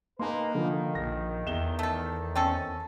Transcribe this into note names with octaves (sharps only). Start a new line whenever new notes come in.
A#3 D#4 B4 G#5 C6
D3 D#3 F3
A#1 A#6
E2 E5 E7 G7
A3 A4
C4 C#4 A4